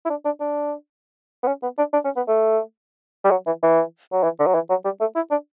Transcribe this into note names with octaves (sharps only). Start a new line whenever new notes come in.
E4
D4
D4
D4
B3
C#4
B3
D4
D4
C#4
B3
A3
G3
F#3
E3
E3
F#3
E3
D3
F#3
E3
F#3
G3
A3
E4
D4